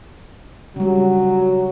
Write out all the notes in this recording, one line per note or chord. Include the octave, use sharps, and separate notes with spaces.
C#3 F#3 G3